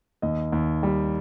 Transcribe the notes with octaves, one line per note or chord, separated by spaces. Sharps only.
D#2 D#5
D#2
G3